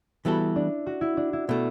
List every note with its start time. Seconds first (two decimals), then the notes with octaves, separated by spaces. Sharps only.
0.25 E3 G3 B3 E4 F#4 A4
0.56 D4
0.86 F#4
1.01 E4
1.17 D4
1.33 E4
1.48 B2 A3 E4